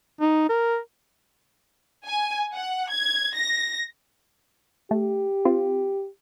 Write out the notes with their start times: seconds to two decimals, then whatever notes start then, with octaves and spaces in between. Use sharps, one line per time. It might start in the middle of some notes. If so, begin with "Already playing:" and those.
0.21 D#4
0.49 A#4
2.05 G#5
2.54 F#5
2.90 G#6
3.35 A#6
4.91 A3 G4
5.45 C4 F4